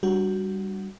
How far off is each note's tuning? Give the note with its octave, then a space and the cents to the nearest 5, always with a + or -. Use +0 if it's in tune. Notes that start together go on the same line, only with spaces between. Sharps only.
G3 +0 D4 +0 F#4 +5